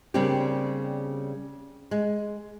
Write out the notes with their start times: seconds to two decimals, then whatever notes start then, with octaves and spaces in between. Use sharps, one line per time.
0.14 C#3 G3 A#3 C4 D4 G4
1.91 G#3